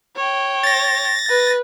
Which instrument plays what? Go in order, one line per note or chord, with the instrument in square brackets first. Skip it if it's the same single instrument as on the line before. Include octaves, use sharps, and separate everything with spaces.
[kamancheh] C#5 G5
[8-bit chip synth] A6 A#6
[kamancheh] B4